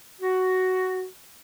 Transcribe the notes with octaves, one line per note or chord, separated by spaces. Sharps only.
F#4